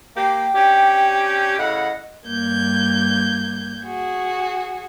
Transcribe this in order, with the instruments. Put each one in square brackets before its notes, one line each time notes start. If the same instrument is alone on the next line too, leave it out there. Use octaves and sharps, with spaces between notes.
[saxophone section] A#3 G4 [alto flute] G5
[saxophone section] C#4 D4 G4
[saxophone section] A2 C#3 F#5 [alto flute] D#5
[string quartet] G2 A#3 G6 G#6
F#4 G#4